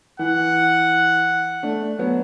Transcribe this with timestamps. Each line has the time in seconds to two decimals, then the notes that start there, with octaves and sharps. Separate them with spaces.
0.19 E3 F#5
1.63 A3 D4
1.99 F#3 B3